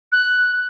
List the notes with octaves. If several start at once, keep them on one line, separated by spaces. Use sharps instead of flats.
F#6